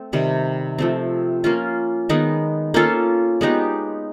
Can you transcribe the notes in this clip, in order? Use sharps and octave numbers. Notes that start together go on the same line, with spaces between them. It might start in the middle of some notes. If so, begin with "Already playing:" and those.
Already playing: A3 C4
C3 D#3 G3
F3 A3 C4
A#3 C#4 F4
D#3 G#3 B3 D#4
A#3 C#4 F4 A4
G#3 B3 D#4 G4